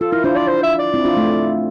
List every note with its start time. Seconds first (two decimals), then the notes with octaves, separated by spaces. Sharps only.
0.01 F4 A4
0.12 E4 A#4
0.24 D4 F4 C5
0.36 D5
0.47 C5
0.63 E5
0.79 D5
0.94 C4 E4
1.05 D4 F4
1.17 A3